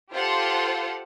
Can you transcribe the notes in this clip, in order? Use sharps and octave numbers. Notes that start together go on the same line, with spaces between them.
F4 G4 A4 C5 F5 F#5